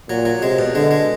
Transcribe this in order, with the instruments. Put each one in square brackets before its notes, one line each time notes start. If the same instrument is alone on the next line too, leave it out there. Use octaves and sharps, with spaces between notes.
[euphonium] A#2 [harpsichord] F#3
[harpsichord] F#3
[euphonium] C3 [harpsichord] G#3
[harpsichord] B2
[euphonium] D3 [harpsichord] G#3
[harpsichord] G#3